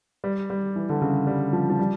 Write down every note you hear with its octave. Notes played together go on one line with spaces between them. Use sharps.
G3
G3
E3
D3
C#3
G3
F3
F3
G3